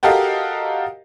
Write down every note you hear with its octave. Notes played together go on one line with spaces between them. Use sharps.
F#4 G4 A4 A#4 D#5 F5